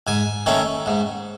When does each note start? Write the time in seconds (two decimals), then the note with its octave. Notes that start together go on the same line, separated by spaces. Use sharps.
0.07 G#2 G#5
0.46 D#3 A3 C#4
0.86 G#2